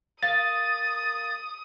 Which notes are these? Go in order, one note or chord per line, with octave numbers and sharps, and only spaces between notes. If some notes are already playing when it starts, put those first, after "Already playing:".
A#3 D#6 A6